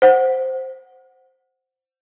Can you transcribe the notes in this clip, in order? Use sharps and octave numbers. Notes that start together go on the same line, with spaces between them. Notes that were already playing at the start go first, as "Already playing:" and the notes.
C5 F#5